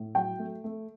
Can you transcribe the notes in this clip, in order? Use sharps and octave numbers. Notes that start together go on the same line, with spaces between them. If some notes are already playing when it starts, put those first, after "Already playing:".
Already playing: A2
F#3 G5
A3
A3